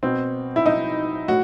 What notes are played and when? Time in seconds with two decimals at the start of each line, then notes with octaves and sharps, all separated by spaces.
0.03 B2 C4
0.56 E4
0.66 D#4
1.28 A2 F#4